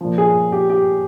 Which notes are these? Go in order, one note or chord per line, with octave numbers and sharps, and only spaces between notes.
A#2 F3
G#4
G4
G4